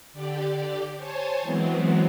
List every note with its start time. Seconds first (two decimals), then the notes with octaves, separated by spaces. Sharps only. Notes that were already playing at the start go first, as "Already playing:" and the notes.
0.13 D3 G4 D5
0.96 C5 C#5 G#5 A5
1.42 E3 F#3 G#3 B3 C4